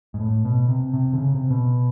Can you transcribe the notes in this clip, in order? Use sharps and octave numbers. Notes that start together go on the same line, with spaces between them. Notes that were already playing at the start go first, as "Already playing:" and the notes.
G#2
A2
B2
C3
C3
D3
C#3
C3
B2